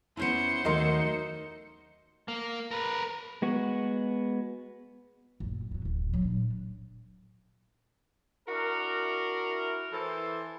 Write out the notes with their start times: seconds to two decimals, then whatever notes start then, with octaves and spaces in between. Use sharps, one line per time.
0.17 B3 C#4 E4 C5 C#7
0.65 D#2 F#3 A3 D#4 A#4 D#5 C6
2.28 A#3
2.71 A#4 B4
3.42 G#3 B3 F#4
5.40 F#1 A#2
5.71 B2 F#3
5.85 D1
6.09 A#2 F#3
6.22 A#2 D4
8.48 D4 E4 F#4 A#4
9.92 E3 A4 C5